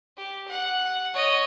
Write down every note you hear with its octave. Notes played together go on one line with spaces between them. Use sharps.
G4
F#5
C#5 D#5